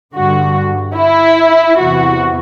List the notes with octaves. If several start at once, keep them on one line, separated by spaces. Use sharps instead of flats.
G2 D3 F#4
E4
E2 C3 E3 F#4